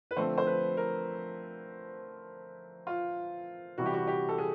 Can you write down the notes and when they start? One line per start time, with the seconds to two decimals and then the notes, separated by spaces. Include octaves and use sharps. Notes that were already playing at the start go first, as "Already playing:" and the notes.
0.11 B4
0.17 D3 F3 A3 C4 C5
0.38 C5
0.47 B4
0.77 A#4
2.87 F4
3.78 C3 E3 G3 F#4
3.86 G4
3.94 F#4
4.07 G4
4.29 A4
4.38 G#4